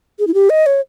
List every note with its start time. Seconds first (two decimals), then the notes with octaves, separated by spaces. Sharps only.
0.19 G#4
0.27 E4
0.34 G4
0.50 D#5
0.66 C#5